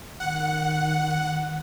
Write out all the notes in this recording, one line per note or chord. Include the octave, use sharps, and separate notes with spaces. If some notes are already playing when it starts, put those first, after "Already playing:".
D#3 F#5